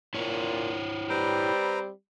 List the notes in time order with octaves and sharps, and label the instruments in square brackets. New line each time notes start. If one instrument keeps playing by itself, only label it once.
[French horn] A#2 [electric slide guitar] E4 C5 C#5
[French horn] G3 [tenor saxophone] C4 [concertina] B4 A#5